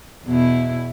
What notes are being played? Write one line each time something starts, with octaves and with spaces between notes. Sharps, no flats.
E2 B2 E4